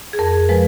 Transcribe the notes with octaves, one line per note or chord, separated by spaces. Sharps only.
G#4
F2 A#4
F3 G#3 B4